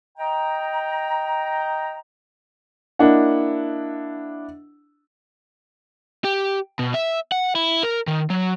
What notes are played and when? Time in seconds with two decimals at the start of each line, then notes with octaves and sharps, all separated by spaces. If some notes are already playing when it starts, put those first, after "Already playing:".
0.18 D#5 G5 A#5
2.99 A#3 D4 E4 D#5 F#5
6.25 G4
6.79 B2
6.94 E5
7.32 F#5
7.55 E4
7.83 A#4
8.07 D#3
8.30 F#3